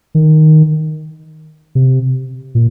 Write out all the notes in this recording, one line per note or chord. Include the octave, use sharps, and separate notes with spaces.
D#3
C3
A#2